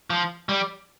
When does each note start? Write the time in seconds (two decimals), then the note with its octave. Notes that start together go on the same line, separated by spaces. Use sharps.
0.10 F3
0.49 G3